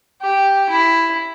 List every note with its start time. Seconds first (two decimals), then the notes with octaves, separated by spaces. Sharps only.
0.22 G4
0.69 E4